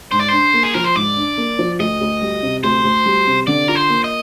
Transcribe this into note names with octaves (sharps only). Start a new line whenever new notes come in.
G#2 C5
D5
D4 C5
A#3
G#4
F3 A#4
C5
G#2 D5
D4
A#3
F3
D2 D#5
D2
G3
C3
D2 C5
D2
G3
C3
D3 D5
F4 A#4
C5
A#3
D#5